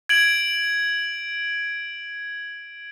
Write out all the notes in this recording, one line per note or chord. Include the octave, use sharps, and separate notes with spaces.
G#6 D7 F#7